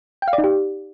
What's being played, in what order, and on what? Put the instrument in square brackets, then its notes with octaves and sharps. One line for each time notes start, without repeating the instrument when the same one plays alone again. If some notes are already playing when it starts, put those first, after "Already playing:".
[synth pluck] G5
F5
D5
D#4
G4